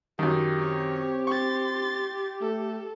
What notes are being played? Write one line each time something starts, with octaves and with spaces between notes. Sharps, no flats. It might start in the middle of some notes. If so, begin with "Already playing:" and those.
F#2 D#3 G4
C4 C#5
C6 C#6 A6
A3 A4